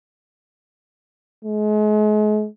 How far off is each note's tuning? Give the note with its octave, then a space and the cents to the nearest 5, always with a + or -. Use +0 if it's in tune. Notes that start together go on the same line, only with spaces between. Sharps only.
G#3 +35